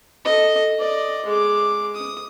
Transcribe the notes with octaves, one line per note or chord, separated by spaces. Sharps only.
A4 D#5
D5 D#5
G#3 D6
D#6